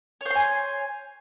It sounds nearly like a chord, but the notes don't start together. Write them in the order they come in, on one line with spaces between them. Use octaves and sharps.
C#5 C5 C6 G#5